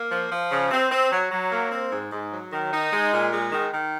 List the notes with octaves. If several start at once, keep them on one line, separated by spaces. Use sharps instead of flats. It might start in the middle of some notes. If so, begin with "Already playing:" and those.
Already playing: A#3
F3
F3
C#3
C4
C4
F#3
F#3
A#3
C4
G#2
G#2
F#3
D#3
D#4
G#3
A#2
G#3
D#3
D#3